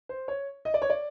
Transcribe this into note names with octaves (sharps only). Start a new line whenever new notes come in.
C5
C#5
D#5
D5
C#5
D5